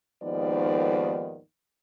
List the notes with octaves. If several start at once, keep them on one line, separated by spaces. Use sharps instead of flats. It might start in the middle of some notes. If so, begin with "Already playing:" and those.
D#2 G#2 D#3 F3 B3 D5